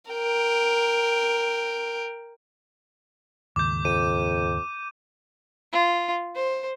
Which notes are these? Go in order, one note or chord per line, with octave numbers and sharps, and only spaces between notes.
A#4 G5
D#2 G#2 C#3 D6 G6
F2 D#7
F4
C5